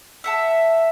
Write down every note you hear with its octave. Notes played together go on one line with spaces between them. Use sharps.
E5 F#5 A5